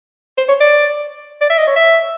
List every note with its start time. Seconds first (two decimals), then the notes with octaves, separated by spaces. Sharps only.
0.38 C5
0.49 C#5
0.61 D5
1.41 D5
1.50 E5
1.58 D#5
1.67 C#5
1.76 E5